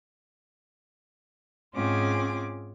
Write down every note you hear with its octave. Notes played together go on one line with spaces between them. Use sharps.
G#2 C4 C#4 F4 G#4 D6